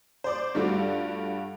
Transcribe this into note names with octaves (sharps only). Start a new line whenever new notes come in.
C5 D5 D6
G2 G3 A3 F4 F#4